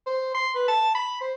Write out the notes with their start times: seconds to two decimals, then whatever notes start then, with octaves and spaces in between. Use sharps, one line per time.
0.07 C5
0.34 C6
0.55 B4
0.68 A5
0.95 B5
1.21 C5